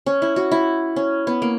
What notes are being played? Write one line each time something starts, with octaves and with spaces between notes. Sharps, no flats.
C#4
E4
F#4
E4
C#4
B3
A#3